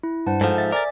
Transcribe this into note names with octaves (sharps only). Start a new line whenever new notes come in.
E4
G2 C5 F#5 A5
G#2 F3 A4 C5
E5 A6
A#4 D5 G#5 A6